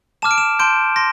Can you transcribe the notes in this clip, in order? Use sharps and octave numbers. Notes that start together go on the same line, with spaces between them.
A5 D6 F6 E7
D7
E7
A5 C6 G6 D7
C6 A#6